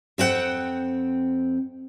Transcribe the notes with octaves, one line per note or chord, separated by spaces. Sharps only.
F2 C4 E4 F#5 G5